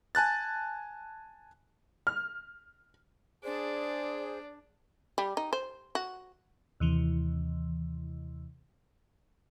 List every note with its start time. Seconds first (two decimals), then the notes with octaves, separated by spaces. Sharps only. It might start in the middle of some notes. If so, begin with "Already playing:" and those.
0.15 G#5 A5 F#6 A6
2.07 F6
3.44 D4 G#4 C5 D5
5.18 G3
5.37 D#4
5.53 C5
5.95 F#4
6.80 D#2 C3 E3